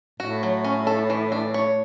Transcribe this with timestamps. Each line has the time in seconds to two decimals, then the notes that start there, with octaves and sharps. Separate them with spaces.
0.20 A2 F#4
0.43 F#3
0.64 C#4
0.87 A4
1.10 E3
1.32 D4
1.54 C#5